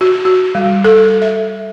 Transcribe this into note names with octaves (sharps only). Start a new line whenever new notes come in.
F#4
F#4
G3
A4
E5